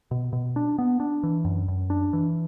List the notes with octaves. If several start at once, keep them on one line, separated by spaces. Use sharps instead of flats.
B2
B2
D4
B3
D4
E3
F#2
F#2
D4
E3